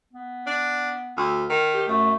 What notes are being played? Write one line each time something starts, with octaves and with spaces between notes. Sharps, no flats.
B3
D4
D2
D#3
G4
F#2 A3